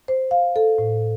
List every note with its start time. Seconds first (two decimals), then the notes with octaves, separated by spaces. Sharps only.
0.08 C5
0.31 F5
0.56 A4
0.78 A2